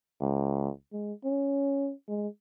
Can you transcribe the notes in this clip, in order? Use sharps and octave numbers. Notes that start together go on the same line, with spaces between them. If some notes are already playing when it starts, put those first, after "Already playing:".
C#2
G#3
C#4
G#3